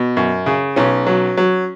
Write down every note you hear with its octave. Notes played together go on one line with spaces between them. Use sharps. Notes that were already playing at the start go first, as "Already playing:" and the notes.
Already playing: B2
F#2
C#3
B1 C#4
F#3
F#3